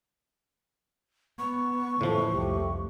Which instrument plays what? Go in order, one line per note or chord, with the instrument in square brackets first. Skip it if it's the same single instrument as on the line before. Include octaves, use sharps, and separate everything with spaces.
[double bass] B3 [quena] C#6
[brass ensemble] F#1 F2 A4 [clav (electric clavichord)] A2 F3 [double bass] D3 E3
[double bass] C2 F2 [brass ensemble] A3 G4